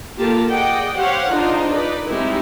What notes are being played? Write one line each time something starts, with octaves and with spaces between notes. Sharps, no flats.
A#3 F4 G4 A4 A#4 A5
G#4 D5 D#5 F#5 G5
G4 C5 C#5 F5 F#5
D4 D#4 F4 G#4 C5
D#4 B4 D5
G3 G#3 C4 D#4 E4